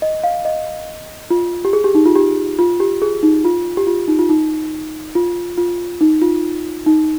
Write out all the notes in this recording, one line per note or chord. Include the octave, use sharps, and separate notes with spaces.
D#5
F5
D#5
F4
G4
G#4
G4
D#4
F4
G4
F4
G4
G#4
D#4
F4
G4
F4
D#4
F4
D#4
F4
F4
D#4
F4
D#4